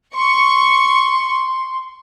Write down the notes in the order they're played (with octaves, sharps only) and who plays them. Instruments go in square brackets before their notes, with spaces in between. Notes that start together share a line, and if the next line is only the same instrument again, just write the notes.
[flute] C6 [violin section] C#6